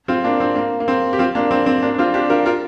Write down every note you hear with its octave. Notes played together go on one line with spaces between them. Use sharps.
C4 F4
A#3 D4
C4
A#3
A#3
C4
G4
C4 F4
A#3 D4
C4
C4
A#3 D4
D4
C4 F4
D4 G4
F4 A#4
F4 A#4